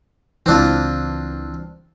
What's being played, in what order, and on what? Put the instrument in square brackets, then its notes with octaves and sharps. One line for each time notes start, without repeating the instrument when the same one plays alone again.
[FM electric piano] C#2 E3 [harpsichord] C4 D4 F4